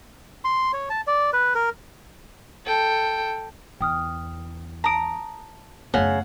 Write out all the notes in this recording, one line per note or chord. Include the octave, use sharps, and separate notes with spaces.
C6
C#5
A5
D5
B4
A#4
A4 G5
E2 G5 D#6 F6
A5 A#5 D#6 D7
F#2 C#3 A3 F#5